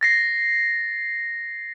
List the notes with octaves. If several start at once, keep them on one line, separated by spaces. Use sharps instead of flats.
A6 A#6 C7